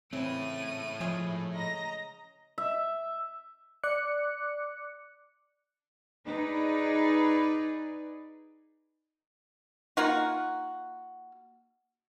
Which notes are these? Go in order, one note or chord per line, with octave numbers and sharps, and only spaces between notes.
C#3 E3 A3 C4 E4 D#7
F3 G#3 C#4 G#4
D#5 A#5
E5
D5 D6 F#6 C#7
D#4 G#4 B4 D5
A#3 D#4 F4 F#4